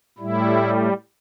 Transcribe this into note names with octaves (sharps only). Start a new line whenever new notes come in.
A2 G3 E4